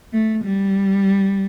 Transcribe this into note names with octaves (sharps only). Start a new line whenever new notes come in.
A3
G3